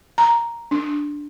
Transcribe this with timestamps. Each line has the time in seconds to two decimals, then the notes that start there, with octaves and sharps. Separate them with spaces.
0.18 A#5
0.71 D4